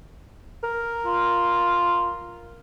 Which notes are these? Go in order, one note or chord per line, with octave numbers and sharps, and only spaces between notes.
A#4
F4